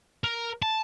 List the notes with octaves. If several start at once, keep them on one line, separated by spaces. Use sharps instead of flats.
A#4
A5